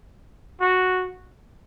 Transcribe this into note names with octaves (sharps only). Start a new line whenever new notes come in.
F#4